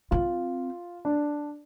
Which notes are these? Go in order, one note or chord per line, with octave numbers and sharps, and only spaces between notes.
C4 F4
D4